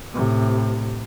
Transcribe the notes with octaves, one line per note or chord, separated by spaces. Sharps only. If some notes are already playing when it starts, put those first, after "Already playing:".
A2 C3